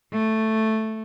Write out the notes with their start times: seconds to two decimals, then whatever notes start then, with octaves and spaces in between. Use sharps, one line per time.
0.13 A3